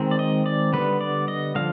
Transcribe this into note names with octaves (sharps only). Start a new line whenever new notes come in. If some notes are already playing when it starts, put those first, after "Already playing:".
Already playing: D#3 G#3 C4
D5
D#5
D5
D3 G3 B3 B4
D5
D#5
D3 F3 F5